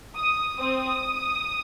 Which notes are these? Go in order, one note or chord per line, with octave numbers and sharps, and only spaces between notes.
D#6
C4 D#6